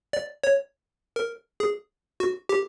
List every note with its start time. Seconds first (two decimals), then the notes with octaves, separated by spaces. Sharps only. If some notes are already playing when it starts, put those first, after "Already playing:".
0.13 D5
0.44 C#5
1.16 A#4
1.60 G#4
2.20 F#4
2.49 G4